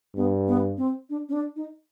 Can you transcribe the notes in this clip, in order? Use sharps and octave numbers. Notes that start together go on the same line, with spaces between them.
G2 B3
B3
C4
D4
C#4
D4
D#4